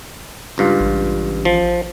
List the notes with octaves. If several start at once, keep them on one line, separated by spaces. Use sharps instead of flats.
C#2 G2 F4
A1
F3